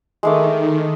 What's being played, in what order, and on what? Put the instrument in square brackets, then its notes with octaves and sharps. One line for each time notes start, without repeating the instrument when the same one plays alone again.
[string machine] D#3 [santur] G#3 A3 D6